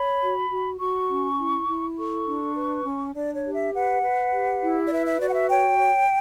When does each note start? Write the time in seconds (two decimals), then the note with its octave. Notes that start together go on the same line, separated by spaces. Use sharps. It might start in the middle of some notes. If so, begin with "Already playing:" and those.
Already playing: C#5 B5
0.21 F#4
0.51 F#4
0.80 F#4 C#6
1.09 C#4
1.39 E4
1.68 E4
1.97 A4 C#6
2.27 D4
2.56 B4
2.86 C#4
3.15 D4 D5
3.34 C#5
3.44 G4
3.54 E5
3.73 B4 F#5
4.03 B4
4.32 G4
4.62 E4
4.87 D5
4.91 B4 E5
5.06 E5
5.20 F#4 D5
5.29 F#5
5.34 E5
5.49 C#5 G5
5.79 C#5